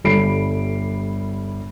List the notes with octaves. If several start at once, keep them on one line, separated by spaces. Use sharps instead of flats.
G1 G3 A4 B5 C7 D7